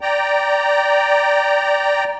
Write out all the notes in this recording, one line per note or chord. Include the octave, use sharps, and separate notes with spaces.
D5 G5 A#5